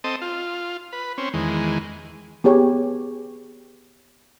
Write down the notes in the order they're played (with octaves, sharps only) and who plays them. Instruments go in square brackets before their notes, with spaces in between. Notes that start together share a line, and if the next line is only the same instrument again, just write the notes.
[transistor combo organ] C4 A4 D#5
F4
B4
C4 C#4
E2 D#3 G#3
[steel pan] B3 G4 G#4 C#5